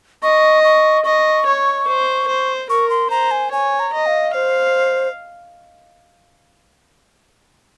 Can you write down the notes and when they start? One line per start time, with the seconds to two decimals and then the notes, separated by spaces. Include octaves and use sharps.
0.23 D#5 C#6
0.64 C#6
1.04 D#5 C#6
1.46 C#5
1.87 C5
2.28 C5
2.70 A#4 C#6
2.90 C6
3.10 C5 A#5
3.31 G#5
3.52 C#5 G#5
3.80 A#5
3.93 D#5
4.06 F5
4.34 C5 F5